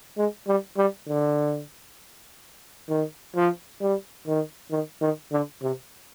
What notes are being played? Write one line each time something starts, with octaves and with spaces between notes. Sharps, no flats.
G#3
G3
G3
D3
D#3
F3
G3
D#3
D#3
D#3
D3
C3